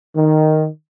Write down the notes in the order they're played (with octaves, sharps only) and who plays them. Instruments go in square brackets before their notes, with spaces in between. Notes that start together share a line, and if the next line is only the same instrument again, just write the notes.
[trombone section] D#3